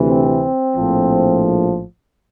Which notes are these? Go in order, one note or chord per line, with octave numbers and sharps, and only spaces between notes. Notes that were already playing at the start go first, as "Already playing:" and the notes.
Already playing: D2 C3 E3
C4
A#1 A2 F3